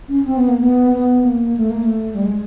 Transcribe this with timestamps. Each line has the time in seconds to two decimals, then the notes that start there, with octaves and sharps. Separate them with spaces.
0.09 C#4
0.25 C4
0.37 B3
0.48 A#3
0.60 B3
0.91 B3
1.24 A#3
1.57 A3
1.70 A#3
1.83 A3
2.15 G3
2.23 G#3